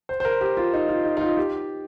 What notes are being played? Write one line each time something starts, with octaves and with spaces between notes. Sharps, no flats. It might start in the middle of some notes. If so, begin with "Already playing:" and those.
C5
C5
A#4
G4
F4
D#4
F4
D#4
D#4
F4
G4